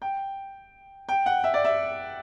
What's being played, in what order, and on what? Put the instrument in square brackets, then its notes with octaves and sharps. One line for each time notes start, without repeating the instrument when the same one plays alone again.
[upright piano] G5
G5
F#5
E5
D5
E5